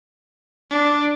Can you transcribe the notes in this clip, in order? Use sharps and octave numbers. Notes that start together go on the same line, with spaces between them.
D4